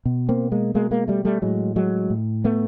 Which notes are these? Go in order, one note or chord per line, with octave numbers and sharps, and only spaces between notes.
B2
A#3 C4
G#3 A#3
B2 G#3 A#3
G#3 A#3
G3 A3
G3 A3
A2 F#3 G#3
F#3 G#3
A2
A3 B3